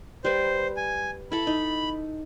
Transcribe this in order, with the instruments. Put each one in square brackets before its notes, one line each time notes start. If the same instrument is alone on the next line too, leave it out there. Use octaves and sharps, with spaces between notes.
[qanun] G3 B4 [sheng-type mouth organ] C5
[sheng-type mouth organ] G#5
[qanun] E4 A4 [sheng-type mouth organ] B5
[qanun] D#4